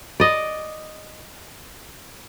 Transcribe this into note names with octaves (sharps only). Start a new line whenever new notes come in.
D5 D#5